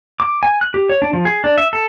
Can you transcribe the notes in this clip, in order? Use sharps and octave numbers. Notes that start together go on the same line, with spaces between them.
D6
G#5
F#6
G4
C#5
D4
F3
G#4
D4
E5
A4